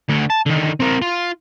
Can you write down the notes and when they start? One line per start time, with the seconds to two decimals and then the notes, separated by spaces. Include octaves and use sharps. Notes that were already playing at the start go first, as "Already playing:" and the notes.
0.09 D2 D3
0.30 A5
0.46 D3 D#3
0.80 C4 A#4
1.02 F4